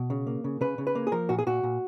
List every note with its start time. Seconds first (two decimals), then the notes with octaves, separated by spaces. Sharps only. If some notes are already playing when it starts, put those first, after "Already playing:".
Already playing: B2
0.10 C#3
0.27 A#3
0.44 C#3
0.61 C#3 B4
0.78 C#3
0.87 B4
0.95 A#3
1.07 G#4
1.12 F3 A#4
1.29 A#2 F#4
1.39 G#4
1.47 A#2 F#4
1.63 A#2